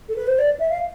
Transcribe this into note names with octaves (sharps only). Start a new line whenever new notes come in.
A4
B4
C5
D5
E5
F5